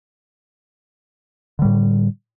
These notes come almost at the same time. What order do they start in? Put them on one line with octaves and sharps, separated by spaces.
D3 G3 A2